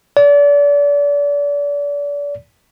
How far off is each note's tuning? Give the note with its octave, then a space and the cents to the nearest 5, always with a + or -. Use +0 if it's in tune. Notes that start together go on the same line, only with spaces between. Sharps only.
D5 -35